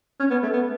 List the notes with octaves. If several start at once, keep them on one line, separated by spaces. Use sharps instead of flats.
C#4
B3
A3
B3